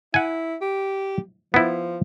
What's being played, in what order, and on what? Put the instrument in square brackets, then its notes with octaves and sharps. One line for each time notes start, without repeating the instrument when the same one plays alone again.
[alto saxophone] E4 [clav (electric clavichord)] F#5 G#5
[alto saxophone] G4
[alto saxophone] F3 [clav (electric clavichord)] B3 E4